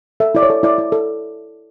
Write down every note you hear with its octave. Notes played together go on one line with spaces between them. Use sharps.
A4 E5
E4 D5
C#5
A4
E4 D5
E4
A4